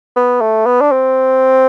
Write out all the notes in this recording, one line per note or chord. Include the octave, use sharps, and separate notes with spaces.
B3
A3
B3
D4
C4